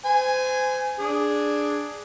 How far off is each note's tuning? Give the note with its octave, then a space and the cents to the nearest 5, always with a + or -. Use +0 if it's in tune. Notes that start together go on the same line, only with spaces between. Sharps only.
C5 -35 G#5 +0
D4 +0 G#4 +0